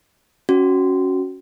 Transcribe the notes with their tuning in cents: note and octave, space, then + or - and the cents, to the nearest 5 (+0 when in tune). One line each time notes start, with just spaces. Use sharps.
C#4 +0 F#4 +0